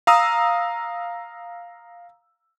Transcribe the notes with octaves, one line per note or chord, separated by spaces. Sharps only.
F5 A#5 D#6 E6